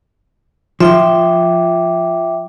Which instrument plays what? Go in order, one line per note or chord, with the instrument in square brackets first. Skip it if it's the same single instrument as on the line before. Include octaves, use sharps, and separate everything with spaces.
[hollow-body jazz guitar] F3 [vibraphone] E5 G5 D6